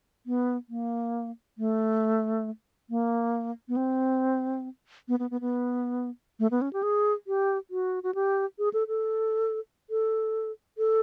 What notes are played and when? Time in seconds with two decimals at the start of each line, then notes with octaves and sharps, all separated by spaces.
0.26 B3
0.69 A#3
1.58 A3
2.90 A#3
3.68 B3
3.76 C4
5.08 B3
5.19 B3
5.31 B3
5.41 B3
6.39 A3
6.51 B3
6.61 C#4
6.73 G4
6.83 G#4
7.27 G4
7.71 F#4
8.03 F#4
8.15 G4
8.59 G#4
8.74 A4
8.88 A4
9.90 A4
10.78 A4